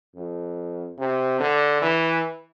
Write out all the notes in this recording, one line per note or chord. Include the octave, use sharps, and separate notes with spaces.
F2
C3
D3
E3